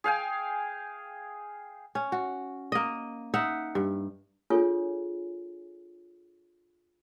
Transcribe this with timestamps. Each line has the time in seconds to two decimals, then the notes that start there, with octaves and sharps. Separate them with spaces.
0.04 G#4 F5 G5 G#5
1.95 C#4
2.12 F#4
2.72 A#3 D#5
3.34 D#4 E5 F#5
3.75 G2
4.50 D4 F4 G#4 A4 C#5 G#5